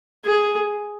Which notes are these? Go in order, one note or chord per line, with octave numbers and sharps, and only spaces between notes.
G#4